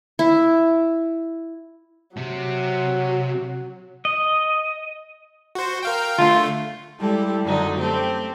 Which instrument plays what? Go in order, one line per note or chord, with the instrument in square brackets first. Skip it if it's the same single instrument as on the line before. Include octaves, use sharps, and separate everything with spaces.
[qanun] E4
[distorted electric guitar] C3 [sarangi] F#3
[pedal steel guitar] D#5
[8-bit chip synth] F#4 C5
A#4 F5 G5
[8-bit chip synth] D3 A3 [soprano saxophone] F4
[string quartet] G3 G#3 E4 G4 A4
F#2 D3 F#3 D#4
A3 C4 G4 A4